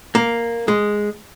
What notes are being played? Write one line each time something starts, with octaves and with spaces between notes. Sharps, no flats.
A#3
G#3